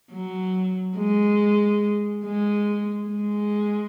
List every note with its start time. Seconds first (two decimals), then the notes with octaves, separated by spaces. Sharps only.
0.13 F#3
0.97 G#3
2.25 G#3
3.09 G#3